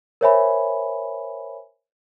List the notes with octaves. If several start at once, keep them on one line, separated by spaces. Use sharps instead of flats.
A#4 C5 C#5 E5 G#5 B5